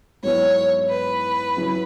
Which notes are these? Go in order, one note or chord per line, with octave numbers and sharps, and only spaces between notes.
G#2 F#3 B3 E4 C#5
B4
C#3 F#3 C#4 E4